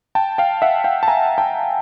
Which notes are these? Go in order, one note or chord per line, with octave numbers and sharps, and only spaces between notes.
G5 A5
F5 G5
E5 F#5
F5 G5
A5
G#5 A#5
G5 A5